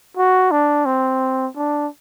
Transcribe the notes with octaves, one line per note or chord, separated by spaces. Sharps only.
F#4
D4
C4
D4